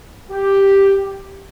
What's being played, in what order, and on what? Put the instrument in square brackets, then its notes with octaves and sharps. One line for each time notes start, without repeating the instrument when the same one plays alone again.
[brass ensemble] G4